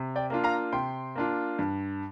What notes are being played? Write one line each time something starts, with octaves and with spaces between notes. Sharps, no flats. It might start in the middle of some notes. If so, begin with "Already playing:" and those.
Already playing: C3
D5 G5
A#3 D4 F4
F5 A#5
C3 G5 C6
A#3 D4 F4
G2